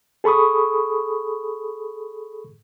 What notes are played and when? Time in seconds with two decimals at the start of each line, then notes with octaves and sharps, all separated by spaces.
0.24 G#4 A4 B5 C#6 D#6